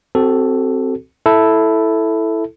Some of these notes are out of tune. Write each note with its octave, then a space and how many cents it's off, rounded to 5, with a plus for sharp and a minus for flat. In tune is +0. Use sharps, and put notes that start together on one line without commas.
C4 +0 F#4 +30 A4 +0
E4 +0 A4 +0